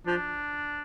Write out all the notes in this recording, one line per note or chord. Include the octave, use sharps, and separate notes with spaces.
F3 D4